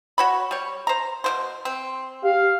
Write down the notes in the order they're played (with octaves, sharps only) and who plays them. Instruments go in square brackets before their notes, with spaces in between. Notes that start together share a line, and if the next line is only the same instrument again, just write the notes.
[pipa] F#4 C#5 B5
G3 C#5
C5 A#5
B2 A#3 C5
C4
[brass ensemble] G4 F5